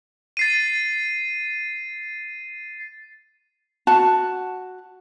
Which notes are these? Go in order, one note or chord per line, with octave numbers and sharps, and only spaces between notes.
A6 C7 D#7
F#4 A5